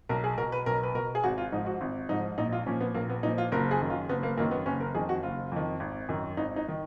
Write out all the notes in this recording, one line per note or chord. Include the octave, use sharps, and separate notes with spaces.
B1 A#4
G#4
B2 A#4
B4
B1 A#4
B4
B2 A#4
G#4
G#1 F#4
F4
G#2 F3 D#4
F#4
G#1
G#2 F3 D#4
A#1 D#4
F4
A#2 F3 C#4
B3
A#1 A#3
B3
A#2 F3 D#4
F4
F#1 A#4
G#4
F#2 D#3
F4
F#1 B3
A#3
F#2 D#3 A#3
B3
F#1 C#4
A#4
F2 D#3 G#4
F#4
F#1 F4
F2 D#3
G#1
F#2 D#3
G#1 D#4
D#4
D#3